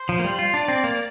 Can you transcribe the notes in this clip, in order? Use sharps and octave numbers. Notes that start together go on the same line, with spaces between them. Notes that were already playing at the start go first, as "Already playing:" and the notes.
Already playing: C5
F3
A#3
G3
F4
D4 D5
C4
A#3